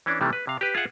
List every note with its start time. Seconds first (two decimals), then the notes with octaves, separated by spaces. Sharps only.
0.06 E3 C#4 D4
0.21 C3 D#3 E3 G3 A3
0.33 B4
0.47 C3 F5
0.61 G4 B4
0.74 F4 G#4 E5 F#5